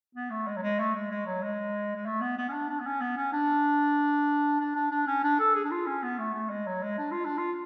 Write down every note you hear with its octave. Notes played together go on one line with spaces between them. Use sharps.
B3
A3
G#3
F#3
G#3
A3
G#3
G#3
F#3
G#3
G#3
A3
B3
B3
C#4
D4
D4
B3
C#4
B3
C#4
D4
D4
D4
D4
C#4
D4
A4
G#4
D4
F4
C#4
B3
A3
A3
G#3
F#3
G#3
D4
F4
D4
F4